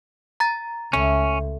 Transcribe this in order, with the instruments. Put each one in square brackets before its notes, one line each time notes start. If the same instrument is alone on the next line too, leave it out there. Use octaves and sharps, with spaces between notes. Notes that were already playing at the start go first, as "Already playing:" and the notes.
[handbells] A#5 A6
[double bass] C#2 [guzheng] A3 [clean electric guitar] C#4